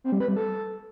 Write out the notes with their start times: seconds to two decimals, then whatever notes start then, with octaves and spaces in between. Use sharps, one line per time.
0.04 C4
0.12 G3
0.20 B4
0.28 G3
0.36 A4